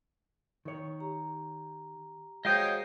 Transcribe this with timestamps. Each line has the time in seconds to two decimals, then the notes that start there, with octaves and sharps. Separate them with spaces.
0.65 D#3 C#5
1.00 G4 A#5
2.45 G#3 F#4 C5 C#5 D#5 F5 G5 D#6